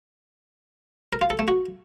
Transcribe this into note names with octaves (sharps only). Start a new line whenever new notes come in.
A#4
F4
A4
A3
F#4